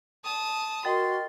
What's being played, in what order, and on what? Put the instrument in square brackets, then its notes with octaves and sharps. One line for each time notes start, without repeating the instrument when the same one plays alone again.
[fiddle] A5 D#6
[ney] F#4 [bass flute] A#4 [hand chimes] D#5 G5 A6 [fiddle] C6